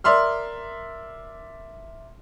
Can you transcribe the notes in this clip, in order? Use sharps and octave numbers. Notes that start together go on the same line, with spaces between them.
A#4 D5 E5 C6 F6